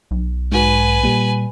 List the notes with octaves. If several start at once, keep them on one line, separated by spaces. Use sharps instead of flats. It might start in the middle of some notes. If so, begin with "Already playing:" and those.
B1
G#2 F#4 B4 G#5
A#2 G3